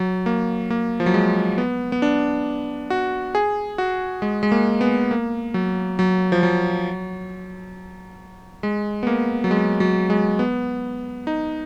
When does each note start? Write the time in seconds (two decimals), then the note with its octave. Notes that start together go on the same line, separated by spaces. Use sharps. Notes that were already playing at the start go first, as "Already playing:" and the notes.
Already playing: F#3
0.26 A#3
0.70 A#3
1.00 F3
1.06 F#3
1.14 G#3
1.58 B3
1.92 B3
2.02 D4
2.90 F#4
3.35 G#4
3.78 F#4
4.22 G#3
4.43 G#3
4.52 A#3
4.81 B3
5.11 A#3
5.54 F#3
5.99 F#3
6.32 F3
6.43 F#3
8.63 G#3
9.03 B3
9.07 A#3
9.44 F#3
9.51 G#3
9.80 F#3
10.10 G#3
10.39 B3
11.27 D#4